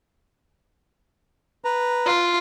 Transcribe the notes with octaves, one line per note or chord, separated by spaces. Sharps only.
B4 A#5
F4